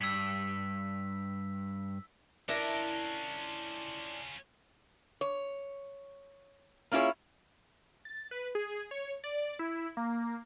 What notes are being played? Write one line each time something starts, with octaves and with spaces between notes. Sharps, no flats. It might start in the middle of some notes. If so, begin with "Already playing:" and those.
G2 E6 G#6 B6
C#4 D4 E4 F4 A#4
C#5
A#3 C#4 E4 F4 G#4 C#5
A6
B4
G#4
C#5
D5
E4
A#3